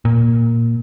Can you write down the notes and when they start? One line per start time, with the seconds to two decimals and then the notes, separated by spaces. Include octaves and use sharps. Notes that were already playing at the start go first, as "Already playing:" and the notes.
0.05 A#2